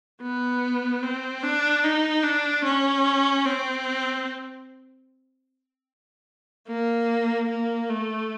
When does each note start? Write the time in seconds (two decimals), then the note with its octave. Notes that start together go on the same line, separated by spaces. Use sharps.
0.22 B3
1.03 C4
1.43 D4
1.84 D#4
2.23 D4
2.65 C#4
3.45 C4
6.67 A#3
7.49 A#3
7.89 A3